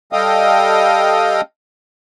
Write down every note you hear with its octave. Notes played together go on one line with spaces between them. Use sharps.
G3 A4 D#5 F5 G5 D#6